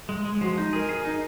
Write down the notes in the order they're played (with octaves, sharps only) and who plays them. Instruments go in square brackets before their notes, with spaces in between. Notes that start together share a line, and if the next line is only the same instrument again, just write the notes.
[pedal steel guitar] G#3
G#3
[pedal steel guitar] F3 [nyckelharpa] F#4
[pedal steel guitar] D#4
[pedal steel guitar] G#4 [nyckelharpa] A#4
[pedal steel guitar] G#4
D#4